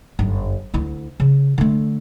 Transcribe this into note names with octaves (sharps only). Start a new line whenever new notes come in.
G1 F#2
D2 E4
C#3
D3 A3